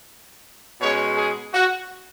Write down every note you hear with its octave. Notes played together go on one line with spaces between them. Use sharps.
B2 G#3 C#4 C#5
G#4
F#4